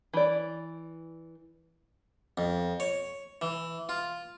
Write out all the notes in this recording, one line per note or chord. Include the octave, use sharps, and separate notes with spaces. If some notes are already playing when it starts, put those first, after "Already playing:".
E3 D5
F2
C#5
E3
F4